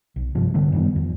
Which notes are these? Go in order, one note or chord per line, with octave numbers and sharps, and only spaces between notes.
B1
G2 C3 F3
D3 E3 G3 A3
F#2 D#3 G3 B3
F2